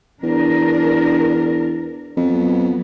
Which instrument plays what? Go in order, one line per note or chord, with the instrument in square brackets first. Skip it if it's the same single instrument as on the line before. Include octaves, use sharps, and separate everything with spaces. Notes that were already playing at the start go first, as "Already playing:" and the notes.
[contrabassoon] E2 [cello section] D4 A#4
[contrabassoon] F2 [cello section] F#3 B3